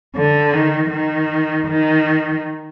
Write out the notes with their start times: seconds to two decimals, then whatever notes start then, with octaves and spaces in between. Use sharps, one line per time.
0.16 D3
0.53 D#3
0.91 D#3
1.67 D#3